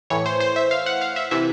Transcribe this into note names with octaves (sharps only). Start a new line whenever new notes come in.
A2 E3 C#5
C5
C5
E5
F5
F#5
F5
E5
C3 E3 E5